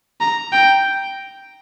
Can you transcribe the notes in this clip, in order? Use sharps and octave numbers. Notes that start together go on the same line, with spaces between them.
A#5
G5